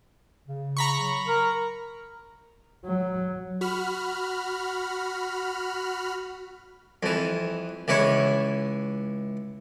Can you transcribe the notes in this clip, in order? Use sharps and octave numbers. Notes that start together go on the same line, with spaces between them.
C#3
A#5 B5 C#6
F#3
A#4
F#3
F#4 B5 F6
F2 E3
C#2 E3 E4 C#5